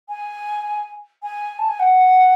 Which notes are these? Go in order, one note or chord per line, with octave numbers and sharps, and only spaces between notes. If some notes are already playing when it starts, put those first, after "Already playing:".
G#5
G#5
A5
G#5
F#5